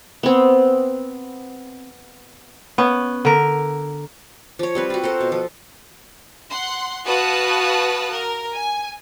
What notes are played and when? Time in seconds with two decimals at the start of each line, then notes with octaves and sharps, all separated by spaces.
0.23 B3 C4
2.78 B3 C#4
3.25 D3 A#4
4.59 F3 C#5
4.75 G3 C4 B4
4.90 F4 F#4
5.03 A4 A#4 C5
5.21 B2
5.32 F3
6.51 F#5 C6
7.06 F#4 B4 F5 A5 D#6 F#6
8.13 A#4
8.54 G#5